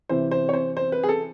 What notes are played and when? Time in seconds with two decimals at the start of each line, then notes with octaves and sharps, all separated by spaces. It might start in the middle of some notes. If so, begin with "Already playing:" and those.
0.09 C3 E3 C5
0.31 C5
0.49 C#5
0.53 C5
0.77 C5
0.92 B4
1.03 G#4
1.09 A4